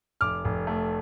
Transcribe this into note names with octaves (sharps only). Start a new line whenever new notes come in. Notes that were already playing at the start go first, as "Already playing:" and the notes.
F1 D6 F6
F1
A3